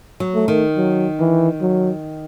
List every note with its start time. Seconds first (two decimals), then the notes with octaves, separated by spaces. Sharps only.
0.20 F#3
0.35 A3
0.48 D#3
0.77 F#3
1.19 E3
1.61 F#3